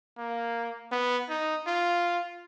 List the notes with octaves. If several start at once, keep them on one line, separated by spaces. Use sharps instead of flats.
A#3
B3
D#4
F4